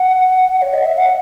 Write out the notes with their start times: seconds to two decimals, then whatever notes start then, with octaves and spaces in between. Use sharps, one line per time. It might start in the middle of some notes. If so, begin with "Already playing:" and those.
Already playing: F#5
0.62 C#5
0.73 D#5
0.86 E5
0.98 F#5